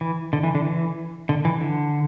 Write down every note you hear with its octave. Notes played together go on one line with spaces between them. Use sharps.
E3
D3
E3
D3
E3
D3
E3
D3